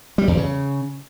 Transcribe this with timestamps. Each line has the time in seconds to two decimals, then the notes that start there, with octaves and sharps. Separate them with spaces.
0.18 G3
0.28 E2
0.37 C#3